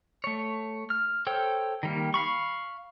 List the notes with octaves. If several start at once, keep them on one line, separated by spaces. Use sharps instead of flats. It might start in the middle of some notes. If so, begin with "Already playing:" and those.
A3 C#5
F6
A4 C5 C#5 G5
D#3 G3 A#3
F5 B5 C#6